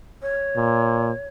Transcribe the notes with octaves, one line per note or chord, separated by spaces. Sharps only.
C#5
A#2